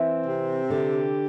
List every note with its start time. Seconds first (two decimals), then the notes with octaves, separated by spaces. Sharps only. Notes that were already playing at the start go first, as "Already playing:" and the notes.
Already playing: E3 C4
0.27 C3
0.70 D3 G4